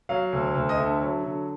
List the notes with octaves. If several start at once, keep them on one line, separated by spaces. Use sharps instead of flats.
F#3 F5
D2
D2
D#5
D3 E5
F#3
D3